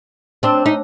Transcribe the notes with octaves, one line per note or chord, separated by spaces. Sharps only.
C4 D4
D#4